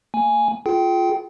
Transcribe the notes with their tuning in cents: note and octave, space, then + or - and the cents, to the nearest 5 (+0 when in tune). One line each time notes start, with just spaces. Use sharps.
A#3 -35 G#5 +0
F4 +0 G#4 +35 G5 -15